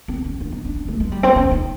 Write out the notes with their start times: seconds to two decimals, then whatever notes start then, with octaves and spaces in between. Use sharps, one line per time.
0.08 C4
0.25 C#4
0.40 D4
0.52 D#4
0.65 D4
0.76 D4
0.88 A3
1.00 G#3
1.12 G3
1.23 C4
1.36 C#4
1.51 D#4